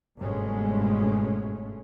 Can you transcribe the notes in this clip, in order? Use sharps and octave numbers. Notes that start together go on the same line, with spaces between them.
G1 G#2 B2 G#3 A3 C#4